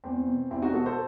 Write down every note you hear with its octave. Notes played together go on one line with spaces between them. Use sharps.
E2 C4
B2
E2 C4 E4
D#4 F#4
B2 F#4 A4
A4 C5